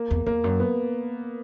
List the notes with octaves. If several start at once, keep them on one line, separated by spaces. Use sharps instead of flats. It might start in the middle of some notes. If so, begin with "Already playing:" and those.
Already playing: A#3
E2
E2 A#3
F#2
B3